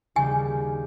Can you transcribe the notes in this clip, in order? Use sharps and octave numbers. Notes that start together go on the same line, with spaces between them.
D#2 C#3 G3 C#4 G4 G#5